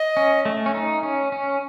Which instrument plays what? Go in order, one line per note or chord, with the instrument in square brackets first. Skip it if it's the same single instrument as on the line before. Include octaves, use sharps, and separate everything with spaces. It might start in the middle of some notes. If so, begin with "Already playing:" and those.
Already playing: [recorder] D#5
[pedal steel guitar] C#4
A3
C#4
D#4
C#4
C#4